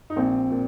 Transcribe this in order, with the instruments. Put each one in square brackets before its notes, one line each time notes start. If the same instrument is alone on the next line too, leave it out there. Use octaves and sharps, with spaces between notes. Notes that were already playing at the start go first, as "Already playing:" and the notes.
[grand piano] D#4
[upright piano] A#1 [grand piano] C4
[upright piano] A#2